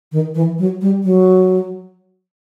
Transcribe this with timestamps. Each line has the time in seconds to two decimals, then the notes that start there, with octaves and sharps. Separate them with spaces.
0.12 D#3
0.35 E3
0.59 F#3
0.81 G3
1.04 F#3